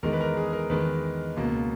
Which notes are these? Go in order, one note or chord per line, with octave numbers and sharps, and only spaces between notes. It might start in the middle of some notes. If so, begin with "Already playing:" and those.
E2 D#3 G#3 A#4
B4
A#4
G#4
A#4
E2 D#3 G#3 B4
C#2 B2 A#3